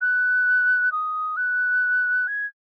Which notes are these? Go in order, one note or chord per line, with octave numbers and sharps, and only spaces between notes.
F#6
D#6
F#6
G#6